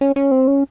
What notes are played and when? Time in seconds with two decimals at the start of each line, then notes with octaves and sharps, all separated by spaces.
0.01 C#4
0.16 C#4
0.31 C4
0.47 C#4